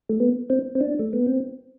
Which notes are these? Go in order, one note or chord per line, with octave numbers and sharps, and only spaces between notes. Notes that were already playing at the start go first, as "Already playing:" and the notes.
A3
B3
C4
C4
D4
A3
B3
C4